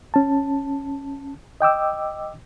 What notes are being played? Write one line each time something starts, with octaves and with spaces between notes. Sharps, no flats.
C#4 A5
D#5 G5 D6 E6